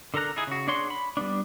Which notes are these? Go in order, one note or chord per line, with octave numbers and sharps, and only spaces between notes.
D3 A4 A#4 A#5 F#6
D#4 E4 G#4
C#3 F#4
D4 G#4 C#5 F#5 C6
B5
G3 A#3 B3 D4